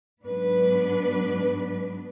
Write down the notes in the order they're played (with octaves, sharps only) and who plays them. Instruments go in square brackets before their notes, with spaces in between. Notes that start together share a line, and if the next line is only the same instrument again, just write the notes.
[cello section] G#2 F#3 B3 D4 B4